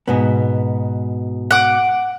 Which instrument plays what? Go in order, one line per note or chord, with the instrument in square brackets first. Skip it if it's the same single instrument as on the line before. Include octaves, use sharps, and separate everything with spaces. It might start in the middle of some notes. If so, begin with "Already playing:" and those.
[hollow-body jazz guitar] G#2 B2 B3
[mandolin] F#5 D6